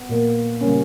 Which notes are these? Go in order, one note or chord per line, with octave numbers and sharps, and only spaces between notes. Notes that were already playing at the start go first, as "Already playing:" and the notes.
Already playing: B3
A#2 A#3
C#3 G3 A#3 C#4